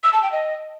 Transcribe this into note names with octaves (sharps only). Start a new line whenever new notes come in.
E6
A5
G5
D#5